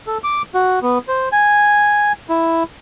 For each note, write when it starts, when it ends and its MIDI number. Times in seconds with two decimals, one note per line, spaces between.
0.07 0.18 69
0.24 0.42 86
0.54 0.79 66
0.82 0.98 59
1.08 1.29 72
1.32 2.12 80
2.29 2.63 64